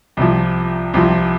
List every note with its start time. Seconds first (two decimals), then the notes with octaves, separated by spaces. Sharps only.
0.17 C2 C3 F3
0.94 C2 C3 F3